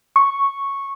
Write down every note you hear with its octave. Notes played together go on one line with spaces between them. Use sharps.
C#6